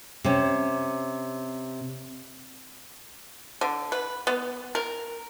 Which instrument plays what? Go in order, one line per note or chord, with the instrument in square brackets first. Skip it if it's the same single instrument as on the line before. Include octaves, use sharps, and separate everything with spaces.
[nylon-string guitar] C3 C#4
[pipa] D3
B4
B3
A#4